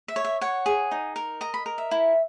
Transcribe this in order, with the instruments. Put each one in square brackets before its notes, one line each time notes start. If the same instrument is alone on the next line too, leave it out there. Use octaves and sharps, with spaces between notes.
[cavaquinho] E5
C#5
E5
C#5 F#5
G#4
D#4
A#4
D#5 A#5
B5
A#4
E5
E4